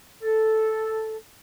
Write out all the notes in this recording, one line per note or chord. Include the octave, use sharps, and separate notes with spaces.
A4